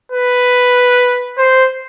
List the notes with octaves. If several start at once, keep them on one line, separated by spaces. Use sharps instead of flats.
B4
C5